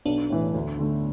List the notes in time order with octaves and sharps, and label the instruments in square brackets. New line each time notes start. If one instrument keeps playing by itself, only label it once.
[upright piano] B1 [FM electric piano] B3 D4
[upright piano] A2 E3
D2
D3 A3